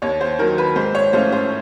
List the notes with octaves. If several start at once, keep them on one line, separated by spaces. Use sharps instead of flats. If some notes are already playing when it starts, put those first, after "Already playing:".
D#2 C#5
C5
D#3 F#3 A#4
B4
G#2 C5
C#5
F3 A3 C#4 F4 C5
C5